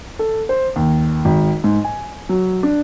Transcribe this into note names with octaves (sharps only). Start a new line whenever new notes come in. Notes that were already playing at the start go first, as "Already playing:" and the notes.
A4
C5
D#2
G#1
G#2
G#5
F#3
D4